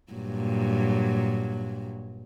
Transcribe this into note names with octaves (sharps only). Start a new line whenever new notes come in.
G2 A#2 F#3